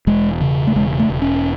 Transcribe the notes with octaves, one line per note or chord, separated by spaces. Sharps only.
E1 G#3
C#3
A3
E1 G#3
A3
E1
C#4